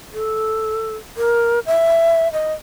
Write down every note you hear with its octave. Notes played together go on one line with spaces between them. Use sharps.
A4
A#4
E5
D#5